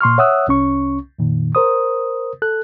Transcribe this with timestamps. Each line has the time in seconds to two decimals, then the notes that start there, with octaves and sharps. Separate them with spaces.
0.01 A#2 C6 C#6 F6
0.18 C#5 E5 F#5 D#6 E6 F#6
0.48 C2 C#4 C#6
1.19 F2 A#2 D#3
1.55 A#4 C5 D#6
2.42 A4 F#6